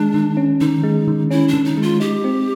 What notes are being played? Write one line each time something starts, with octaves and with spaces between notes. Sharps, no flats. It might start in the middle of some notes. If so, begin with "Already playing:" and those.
Already playing: D#3 G#3 D4
D#3
C#4
D#3 D#4
G#3
D#3
C#4 E4
D4
D#3
D#4
G#3
F4
D#4 G4
C4